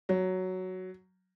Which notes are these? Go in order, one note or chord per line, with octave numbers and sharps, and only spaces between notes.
F#3